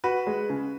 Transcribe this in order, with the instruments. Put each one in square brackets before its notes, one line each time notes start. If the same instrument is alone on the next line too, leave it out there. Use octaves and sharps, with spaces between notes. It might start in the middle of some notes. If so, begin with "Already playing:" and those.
[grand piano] F#4 [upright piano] B4
[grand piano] G#3
C#3